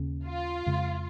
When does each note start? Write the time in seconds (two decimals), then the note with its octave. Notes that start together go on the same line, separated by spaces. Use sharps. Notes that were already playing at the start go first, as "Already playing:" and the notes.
Already playing: D#2 C#3 C#4
0.27 F4
0.66 F2 C#3 G#3